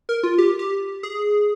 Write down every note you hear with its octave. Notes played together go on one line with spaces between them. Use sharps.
A#4
F4
G4
G4
G#4